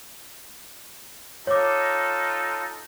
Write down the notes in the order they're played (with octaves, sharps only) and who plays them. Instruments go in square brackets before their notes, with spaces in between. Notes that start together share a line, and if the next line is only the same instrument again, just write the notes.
[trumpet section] D#4 F4 A4 [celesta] C#5 D6